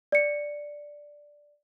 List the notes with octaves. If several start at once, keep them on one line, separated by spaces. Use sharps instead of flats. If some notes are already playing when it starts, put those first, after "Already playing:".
D5 C#7